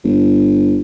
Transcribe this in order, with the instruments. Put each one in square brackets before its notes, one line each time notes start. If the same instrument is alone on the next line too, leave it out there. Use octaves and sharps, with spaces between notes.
[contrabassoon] G1